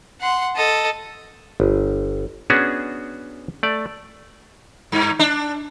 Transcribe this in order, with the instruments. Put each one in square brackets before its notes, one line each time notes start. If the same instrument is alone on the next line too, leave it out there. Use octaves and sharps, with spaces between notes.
[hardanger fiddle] F#5 C6
A4 D#5
[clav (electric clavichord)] G1
B3 C#4 D4 F#4 G#4
A3 D5
[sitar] G2
D4